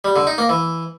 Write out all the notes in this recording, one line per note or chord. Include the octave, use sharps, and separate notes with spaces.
G3
D3
D#4
A#3
E3